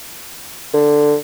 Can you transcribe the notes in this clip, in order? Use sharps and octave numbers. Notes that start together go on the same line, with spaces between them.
D3